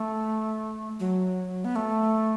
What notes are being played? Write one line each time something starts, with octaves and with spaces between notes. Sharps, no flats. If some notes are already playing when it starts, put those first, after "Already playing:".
Already playing: A3
F#3
B3
A3